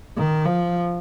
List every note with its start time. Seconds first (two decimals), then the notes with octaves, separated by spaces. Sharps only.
0.16 D#3
0.46 F3